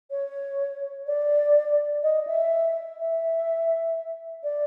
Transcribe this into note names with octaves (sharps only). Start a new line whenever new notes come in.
C#5
D5
D#5
E5
E5
D5